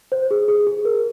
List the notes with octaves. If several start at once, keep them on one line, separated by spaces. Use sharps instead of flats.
C5
G#4
G#4
G#4
A#4